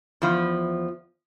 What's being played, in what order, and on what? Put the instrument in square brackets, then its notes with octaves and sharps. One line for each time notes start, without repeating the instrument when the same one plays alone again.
[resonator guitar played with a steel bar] E2 F3